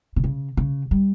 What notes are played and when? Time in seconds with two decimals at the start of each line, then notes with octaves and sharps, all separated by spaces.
0.16 C3
0.24 C#3
0.57 C#3
0.91 G3